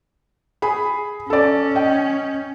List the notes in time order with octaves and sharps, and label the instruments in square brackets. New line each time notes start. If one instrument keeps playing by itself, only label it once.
[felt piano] G#4 B5
[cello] C#4 [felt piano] A4 D5
[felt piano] D#5 G5